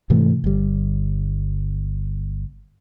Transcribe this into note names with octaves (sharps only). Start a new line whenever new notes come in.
G#2 C3 E3 A3
G1 G3